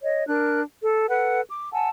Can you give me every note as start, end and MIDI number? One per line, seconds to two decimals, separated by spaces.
0.02 0.24 73
0.02 0.24 75
0.27 0.61 62
0.27 0.61 70
0.27 0.61 90
0.82 1.07 69
1.09 1.41 69
1.09 1.41 71
1.09 1.41 78
1.49 1.71 86
1.73 1.89 78
1.73 1.89 80
1.73 1.89 81
1.73 1.89 88